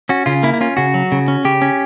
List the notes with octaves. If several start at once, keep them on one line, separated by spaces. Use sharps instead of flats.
C#4 F#4
C#3 F4
A#3 E4
E4
C#4 F4
C#3 F#4
F#3
C#3
C#4
C#3 G4
C#4